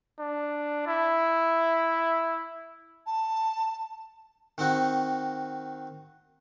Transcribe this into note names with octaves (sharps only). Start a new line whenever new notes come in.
D4
E4
A5
D#3 C4 D#4 F#4